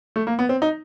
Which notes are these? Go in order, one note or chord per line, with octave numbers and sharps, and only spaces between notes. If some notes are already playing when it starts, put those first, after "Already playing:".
A3
A#3
B3
C4
D#4